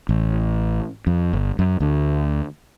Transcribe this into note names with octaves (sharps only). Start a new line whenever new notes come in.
A1
F2
G1
F#2
D2